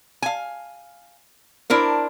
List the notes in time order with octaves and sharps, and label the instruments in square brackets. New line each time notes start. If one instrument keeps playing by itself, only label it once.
[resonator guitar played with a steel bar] F5 G#5
D4 E4 A#4 C5